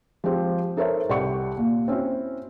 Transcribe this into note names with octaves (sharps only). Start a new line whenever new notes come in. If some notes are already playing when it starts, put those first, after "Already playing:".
F3 G#3 C4 G4 C5
D#4 A4 A#4 C5 C#5 E5
C2 G4 D5 F#5 C#6 C#7
D#2 A#2
C4 C#4 E4 F#4